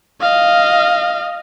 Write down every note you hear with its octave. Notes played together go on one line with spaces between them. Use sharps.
D#5 F5